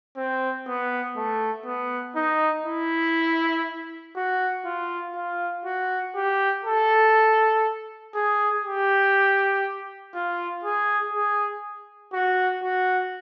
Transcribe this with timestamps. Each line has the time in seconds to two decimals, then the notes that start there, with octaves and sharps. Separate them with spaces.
0.16 C4
0.67 B3
1.16 A3
1.66 B3
2.15 D#4
2.65 E4
4.16 F#4
4.65 F4
5.15 F4
5.65 F#4
6.15 G4
6.65 A4
8.14 G#4
8.65 G4
10.14 F4
10.63 G#4
11.13 G#4
12.13 F#4
12.63 F#4